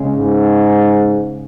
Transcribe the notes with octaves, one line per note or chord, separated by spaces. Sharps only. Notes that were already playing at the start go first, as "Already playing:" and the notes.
Already playing: C#3 G#3
G#2